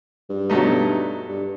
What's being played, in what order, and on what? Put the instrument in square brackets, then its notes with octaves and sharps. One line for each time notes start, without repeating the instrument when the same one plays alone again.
[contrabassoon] G2
[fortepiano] B2 F#3 A3 D#4
[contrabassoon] G2